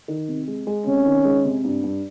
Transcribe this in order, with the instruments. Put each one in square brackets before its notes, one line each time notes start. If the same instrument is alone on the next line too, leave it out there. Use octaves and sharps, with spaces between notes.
[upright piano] D#3
C3
G#3
G#3
[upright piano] C3 [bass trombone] C#4
[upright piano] D#3
G#3
C3
G2
G2